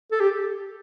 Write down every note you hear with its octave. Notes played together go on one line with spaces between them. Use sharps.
A4
G4